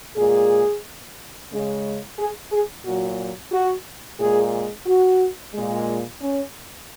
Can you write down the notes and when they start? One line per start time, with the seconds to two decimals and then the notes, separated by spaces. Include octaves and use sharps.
0.16 A#2 G#3 G#4
1.51 C#3 G#3
2.17 G#4
2.52 G#4
2.85 A#2 F#3 F#4
3.52 F#4
4.19 A#2 G#3 G#4
4.86 F#4
5.54 A#2 G#3
6.21 C#4